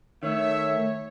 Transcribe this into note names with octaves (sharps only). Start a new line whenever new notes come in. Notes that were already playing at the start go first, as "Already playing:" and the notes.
D#3 A3 C#5 E5